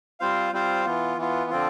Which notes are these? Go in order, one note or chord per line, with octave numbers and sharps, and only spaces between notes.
G3 C4 F4 C5 F5
G3 C4 F4 C5 F5
E3 B3 F4
E3 B3 F4
D3 F3 C4 F4